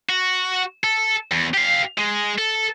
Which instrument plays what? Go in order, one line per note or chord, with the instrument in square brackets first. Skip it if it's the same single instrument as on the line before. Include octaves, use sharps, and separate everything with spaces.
[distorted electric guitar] F#4
A4
E2
G4 F5
G#3
A4